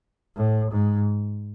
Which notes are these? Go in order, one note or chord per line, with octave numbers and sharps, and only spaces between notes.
A2
G#2